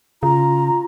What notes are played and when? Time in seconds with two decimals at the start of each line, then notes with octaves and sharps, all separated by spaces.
0.23 C#3 F4 A#5